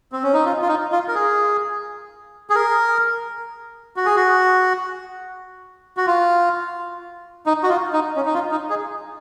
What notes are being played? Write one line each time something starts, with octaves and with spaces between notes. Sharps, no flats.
C4
C#4
D#4
F4
F4
D#4
F4
A#4
G#4
G#4
A#4
F#4
G#4
F#4
F#4
F4
D#4
F#4
F4
D#4
C#4
D#4
F4
D#4
G#4